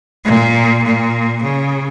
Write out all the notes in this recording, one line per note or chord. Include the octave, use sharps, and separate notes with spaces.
A#2
A#2
C#3